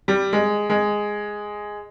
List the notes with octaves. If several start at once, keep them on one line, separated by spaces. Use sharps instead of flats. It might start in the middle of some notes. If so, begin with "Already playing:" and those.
G3
G#3
G#3